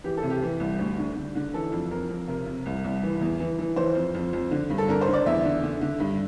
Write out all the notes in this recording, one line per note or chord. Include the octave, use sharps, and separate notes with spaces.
E3 G4
A4
C3
G4
E3
C2
D2
D3
D3
D3
E3 A4
F2
F2 A#4
F2
C3 A#4
C3
C2
C2
E3
E2
E3
E3
E3 C5
F2
F2
F2
D3
G2
A4
D3 A#4
C5
D3
D5
E2 E5
D3
D3
D3
G2